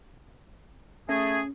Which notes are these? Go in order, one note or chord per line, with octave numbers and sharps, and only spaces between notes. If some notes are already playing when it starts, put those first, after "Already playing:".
A3 C#4 G#4